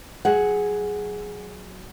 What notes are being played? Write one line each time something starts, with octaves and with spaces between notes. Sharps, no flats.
F#3 G#4 F#5